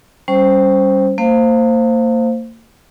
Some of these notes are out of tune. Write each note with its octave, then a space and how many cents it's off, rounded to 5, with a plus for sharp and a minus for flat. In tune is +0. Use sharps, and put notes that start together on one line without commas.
G3 +0 C#4 +0 C5 +0
A#3 -40 C5 +0 F5 +0